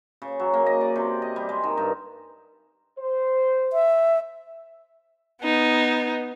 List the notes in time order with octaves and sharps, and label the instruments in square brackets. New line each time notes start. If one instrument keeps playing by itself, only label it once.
[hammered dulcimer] C#3
F#3
A#3
D#5
D5
C3
D#5
G3
G#3
D#3
G2
[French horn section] C5
[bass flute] E5
[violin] B3 D#4